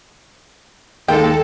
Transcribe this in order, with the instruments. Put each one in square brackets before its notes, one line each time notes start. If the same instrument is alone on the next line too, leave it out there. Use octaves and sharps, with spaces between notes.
[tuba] D#2 [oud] G#3 A#3 [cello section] A4 [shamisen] G5